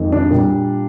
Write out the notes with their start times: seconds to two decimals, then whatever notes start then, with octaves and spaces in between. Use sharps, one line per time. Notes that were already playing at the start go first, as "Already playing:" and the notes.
Already playing: F2 D#3 G#3
0.12 D4
0.31 A#2 G3 A#3